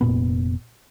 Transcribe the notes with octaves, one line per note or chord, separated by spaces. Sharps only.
F1 A#2 B3